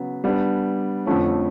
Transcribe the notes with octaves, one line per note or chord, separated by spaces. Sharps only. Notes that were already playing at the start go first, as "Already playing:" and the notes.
Already playing: C#3 F#3 B3
G3 B3 D4
F2 D3 F3 A3 C#4